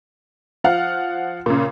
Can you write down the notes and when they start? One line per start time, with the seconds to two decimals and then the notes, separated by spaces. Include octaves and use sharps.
0.64 F3 F5 F#5 F6
1.46 A#2 C#3